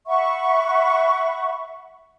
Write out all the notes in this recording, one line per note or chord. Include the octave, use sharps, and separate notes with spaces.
E5 F#5 B5 C#6